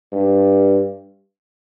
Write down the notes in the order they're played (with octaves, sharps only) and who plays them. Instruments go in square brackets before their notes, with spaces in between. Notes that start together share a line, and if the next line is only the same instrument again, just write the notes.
[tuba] G2